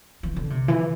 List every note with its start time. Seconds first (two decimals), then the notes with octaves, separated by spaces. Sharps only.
0.23 E3
0.36 D3
0.50 C3
0.68 E3